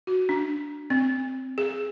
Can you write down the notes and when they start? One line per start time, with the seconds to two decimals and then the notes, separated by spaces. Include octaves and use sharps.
0.07 F#4
0.29 D4
0.90 C4
1.58 G#4